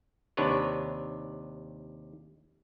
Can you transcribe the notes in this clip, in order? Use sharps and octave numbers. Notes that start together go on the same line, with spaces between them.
D#2 C3 D4 B4 C#5